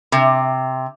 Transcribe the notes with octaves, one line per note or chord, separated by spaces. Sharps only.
C3